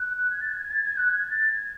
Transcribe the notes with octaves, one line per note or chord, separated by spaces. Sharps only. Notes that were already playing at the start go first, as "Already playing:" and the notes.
Already playing: F#6
G#6
A6
G#6
G#6
A6
G#6
F#6
G#6
A6
G#6